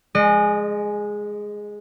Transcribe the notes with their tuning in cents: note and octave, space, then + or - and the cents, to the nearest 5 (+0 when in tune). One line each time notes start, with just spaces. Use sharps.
G#3 +0 D#5 -35